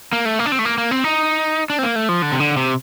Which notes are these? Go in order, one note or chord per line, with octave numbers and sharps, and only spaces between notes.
A#3
A3
A#3
D4
C4
A3
A#3
A#3
C4
D#4
D4
C4
A#3
A3
F3
D3
C3
D3
C3